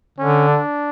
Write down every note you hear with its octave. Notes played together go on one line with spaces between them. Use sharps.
D3 C#4
D4